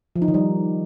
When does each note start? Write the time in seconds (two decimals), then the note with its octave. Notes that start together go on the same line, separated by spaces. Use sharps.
0.16 F3
0.22 D#4
0.28 D#3
0.34 G3